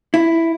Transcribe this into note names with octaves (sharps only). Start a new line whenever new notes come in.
E4